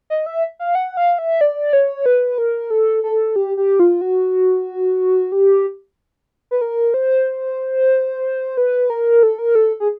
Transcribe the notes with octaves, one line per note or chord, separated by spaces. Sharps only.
D#5
E5
F5
F#5
F5
E5
D5
C#5
B4
A#4
A4
A4
G4
G4
F4
F#4
G4
B4
A#4
C5
B4
A#4
A4
A#4
A4
G#4